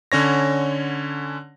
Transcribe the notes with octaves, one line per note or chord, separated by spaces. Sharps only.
D3 C#4 C#5 A#6